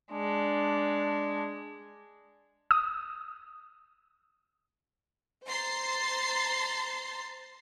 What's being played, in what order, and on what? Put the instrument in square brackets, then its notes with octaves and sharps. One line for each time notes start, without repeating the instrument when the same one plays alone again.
[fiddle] G#3 [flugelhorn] D4
[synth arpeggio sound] D#6
[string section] C5 A#5 C6 A6 C7